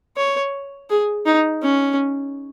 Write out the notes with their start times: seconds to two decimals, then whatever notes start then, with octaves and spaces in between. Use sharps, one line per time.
0.17 C#5
0.90 G#4
1.25 D#4
1.62 C#4